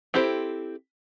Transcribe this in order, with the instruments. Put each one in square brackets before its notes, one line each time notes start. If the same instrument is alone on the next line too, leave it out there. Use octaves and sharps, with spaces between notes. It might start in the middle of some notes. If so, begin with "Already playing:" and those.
[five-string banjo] C4 E4 G4 A4 C5